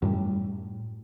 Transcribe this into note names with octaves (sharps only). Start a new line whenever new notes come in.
F#2 A2 G3